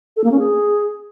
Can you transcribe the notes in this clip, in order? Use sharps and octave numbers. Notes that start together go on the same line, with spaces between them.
A4
A#3
C#4
G#4